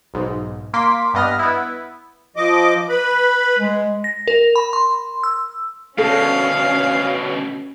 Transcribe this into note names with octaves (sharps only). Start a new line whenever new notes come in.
B1 G#2
A#3 C6 D6 B6
G2 B3 D#5 F6 A#6
B3 E4
F3 D#5 D6
B4 B5
G#3
A#6
A#4
B5
C6
E6
D2 B2 C#4 A4 C#5 F5